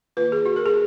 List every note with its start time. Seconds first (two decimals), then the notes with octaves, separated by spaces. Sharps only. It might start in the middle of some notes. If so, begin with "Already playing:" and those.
0.17 D#3 A#3 F4 B4
0.32 G#4
0.46 F#4
0.56 A#4
0.66 G#4